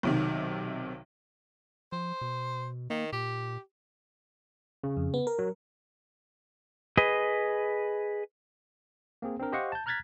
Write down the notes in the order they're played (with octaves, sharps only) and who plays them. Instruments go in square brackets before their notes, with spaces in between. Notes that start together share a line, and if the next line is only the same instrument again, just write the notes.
[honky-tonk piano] B1 C3 D#3
[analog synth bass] F3 [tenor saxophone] C5
[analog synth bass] B2
[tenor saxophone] D#3 [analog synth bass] A#3
[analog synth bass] A#2 [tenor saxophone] G4
[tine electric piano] C#3
[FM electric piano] F2
B3
A#4
[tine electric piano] F#3
[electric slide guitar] G#4 B4 D#5
[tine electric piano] A#3 C4 G#4
C4 D4 A#4
G4 C5 D#5 F5 F#5 C#6
A5 G6
A#5 F6 F#6 G#6 A6 B6